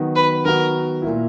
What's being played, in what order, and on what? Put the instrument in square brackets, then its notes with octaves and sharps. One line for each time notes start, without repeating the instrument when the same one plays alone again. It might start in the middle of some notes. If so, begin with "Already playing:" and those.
Already playing: [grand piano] D#3 F#3 B3 F#4
[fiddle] B4
[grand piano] D#3 F#3 B3 F#4 [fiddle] A#4
[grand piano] A#2 A#3 E4